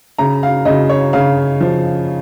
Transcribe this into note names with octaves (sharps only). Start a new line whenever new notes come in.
C#3 A#5
F5
C#3 D#5
C#5
C#3 F5
F3